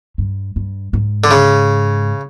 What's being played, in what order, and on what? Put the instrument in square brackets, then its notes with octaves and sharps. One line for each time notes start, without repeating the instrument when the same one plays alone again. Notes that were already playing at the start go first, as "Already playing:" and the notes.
[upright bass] G2
G2
G#2
[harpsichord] D3
C#3